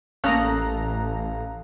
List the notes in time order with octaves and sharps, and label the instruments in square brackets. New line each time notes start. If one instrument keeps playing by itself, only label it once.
[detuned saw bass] A1 [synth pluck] A#3 C#4 [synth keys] A4 A#5 [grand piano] F5 D#6 F#6